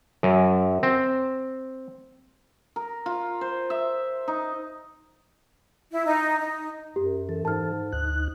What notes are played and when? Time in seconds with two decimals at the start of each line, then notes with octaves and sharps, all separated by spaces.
0.23 F#2
0.83 C4
2.76 A#4
3.06 F4
3.41 C5
3.70 E5
4.28 D#4
5.92 E4
6.05 D#4
6.39 D#4
6.96 F#2 G4
7.29 E3 A4
7.45 G#2 A5 F6
7.92 D2 D#4 F#6